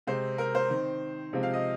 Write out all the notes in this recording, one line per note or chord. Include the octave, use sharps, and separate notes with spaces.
C3 G#3 C4 C5
A#4
C5
D#3 C4
C3 F3 G#3 C4
F5
D#5